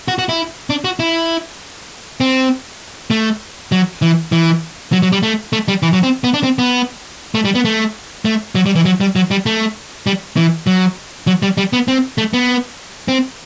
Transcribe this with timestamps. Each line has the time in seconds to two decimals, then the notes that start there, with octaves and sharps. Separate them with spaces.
0.08 F#4
0.19 F#4
0.29 E4
0.70 D4
0.84 F#4
0.99 E4
2.20 C4
3.10 A3
3.72 F#3
4.02 E3
4.32 E3
4.92 F#3
5.02 F#3
5.12 G3
5.23 A3
5.53 A3
5.68 G3
5.83 E3
5.93 F#3
6.03 C4
6.24 B3
6.34 D4
6.43 C4
6.58 B3
7.35 A3
7.45 G3
7.55 B3
7.65 A3
8.25 A3
8.55 F#3
8.66 G3
8.75 E3
8.85 F#3
9.00 G3
9.16 F#3
9.31 G3
9.46 A3
10.07 G3
10.37 E3
10.67 F#3
11.27 F#3
11.42 G3
11.58 G3
11.73 B3
11.88 C4
12.18 A3
12.34 B3
13.08 C4